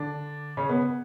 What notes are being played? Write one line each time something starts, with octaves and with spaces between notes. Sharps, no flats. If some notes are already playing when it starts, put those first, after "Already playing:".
Already playing: D3 D4
C#3 C#4
B3